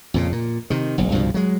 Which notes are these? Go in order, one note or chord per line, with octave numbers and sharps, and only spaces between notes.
F2 A#2 C#3
A#2
C3 D#3
F#1 B1
C2 G2 B2 F3
F#3 G#3